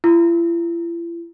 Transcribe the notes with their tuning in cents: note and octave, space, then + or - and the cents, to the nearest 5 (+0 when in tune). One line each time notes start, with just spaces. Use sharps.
E4 +45